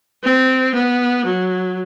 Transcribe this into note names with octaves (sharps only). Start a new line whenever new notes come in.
C4
B3
F#3